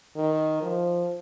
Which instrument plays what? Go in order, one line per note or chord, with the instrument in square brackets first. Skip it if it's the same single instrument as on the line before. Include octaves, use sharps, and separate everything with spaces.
[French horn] D#3
F3